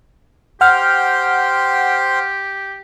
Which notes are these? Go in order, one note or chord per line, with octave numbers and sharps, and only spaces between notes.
G4 C5 F#5 G5 C6 F6